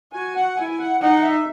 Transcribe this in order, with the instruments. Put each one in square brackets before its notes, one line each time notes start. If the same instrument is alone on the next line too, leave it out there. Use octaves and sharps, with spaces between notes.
[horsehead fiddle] F#4 [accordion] G#5
[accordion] F#5
[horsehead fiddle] E4 [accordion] G#5
[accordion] G#5
F#5
[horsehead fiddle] D#4 [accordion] F#5
[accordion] E5